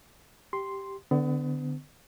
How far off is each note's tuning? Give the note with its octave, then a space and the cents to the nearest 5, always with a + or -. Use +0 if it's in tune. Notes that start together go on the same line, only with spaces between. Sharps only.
G4 +0 C6 +0
D3 +10 B3 +35